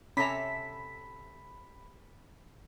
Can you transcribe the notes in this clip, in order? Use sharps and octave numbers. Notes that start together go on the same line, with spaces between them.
C3 C#4 A4 E5 A#5 B5 B6